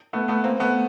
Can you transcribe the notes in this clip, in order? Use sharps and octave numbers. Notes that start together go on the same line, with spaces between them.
A3 B3
A3 B3
A#3 C4
A3 B3